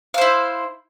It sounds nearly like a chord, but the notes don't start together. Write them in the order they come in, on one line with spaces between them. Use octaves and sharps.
F5 C5 E4